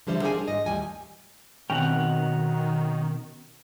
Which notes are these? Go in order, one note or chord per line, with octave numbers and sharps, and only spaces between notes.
D3 F3 G3 C5 E5
C4 D4 G#4 A#4 F#5 G#5
G3
G#2 D#5
D#2 A2 G3 G#5
B2 D#3 C4 C#4 F#4 F#5 G5